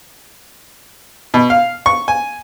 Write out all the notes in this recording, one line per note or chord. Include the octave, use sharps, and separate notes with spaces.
B2
F5
C#6
G#5